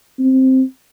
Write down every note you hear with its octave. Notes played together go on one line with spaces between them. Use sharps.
C4